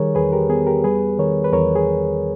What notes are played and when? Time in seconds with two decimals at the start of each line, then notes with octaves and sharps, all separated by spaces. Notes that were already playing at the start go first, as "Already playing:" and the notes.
Already playing: D#3 G3 G#4 A#4 C#5
0.15 E2 G#4 B4
0.33 G4 A#4
0.50 B3 G#4
0.67 G4 A#4
0.84 G3 G#4 B4
1.18 D#3 A#4 C#5
1.44 B4
1.53 E2 A#4 C#5
1.76 G#4